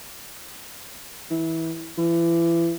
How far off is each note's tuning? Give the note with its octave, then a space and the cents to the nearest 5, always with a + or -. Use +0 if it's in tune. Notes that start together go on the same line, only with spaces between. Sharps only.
E3 -20
E3 +30